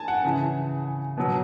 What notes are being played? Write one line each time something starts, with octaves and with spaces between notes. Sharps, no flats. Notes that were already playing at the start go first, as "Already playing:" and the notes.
Already playing: G#5 A5
F#5
C#3 E3
B2 F#3